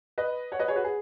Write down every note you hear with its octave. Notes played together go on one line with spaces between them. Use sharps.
B4 D#5
C#5 F#5
B4 D#5
G#4 C#5
F#4 B4
G#4